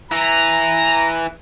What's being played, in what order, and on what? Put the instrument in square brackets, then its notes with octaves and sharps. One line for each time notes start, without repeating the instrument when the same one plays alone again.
[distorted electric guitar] E3 [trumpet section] A#5